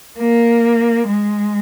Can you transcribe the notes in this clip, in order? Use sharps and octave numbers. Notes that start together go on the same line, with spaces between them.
A#3
G#3